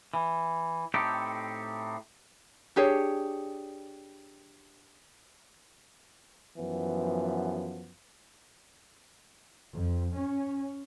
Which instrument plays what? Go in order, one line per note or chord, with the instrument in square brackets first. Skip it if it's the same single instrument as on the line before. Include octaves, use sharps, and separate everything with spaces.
[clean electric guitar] E3
A2 C4 D#4 G4 A4 G5
[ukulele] D4 G4 G#4 C#5
[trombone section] F#2 E3 F3 B3
[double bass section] F2
C#4